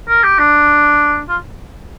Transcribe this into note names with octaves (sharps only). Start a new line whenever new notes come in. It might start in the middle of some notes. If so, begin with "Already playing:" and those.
A#4
G4
D4
F4